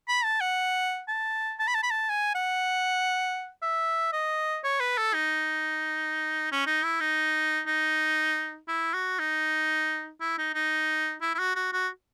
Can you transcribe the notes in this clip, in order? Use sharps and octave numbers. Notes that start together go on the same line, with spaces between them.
B5
A5
F#5
A5
A5
B5
A5
B5
A5
G#5
F#5
E5
D#5
C#5
B4
A4
D#4
C#4
D#4
E4
D#4
D#4
E4
F#4
D#4
E4
D#4
D#4
E4
E4
F#4
F#4
F#4